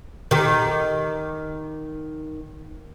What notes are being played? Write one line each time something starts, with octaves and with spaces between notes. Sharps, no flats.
D#3 G4